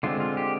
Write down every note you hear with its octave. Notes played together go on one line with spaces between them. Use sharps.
D3 G#3 C4 F4
F4
G4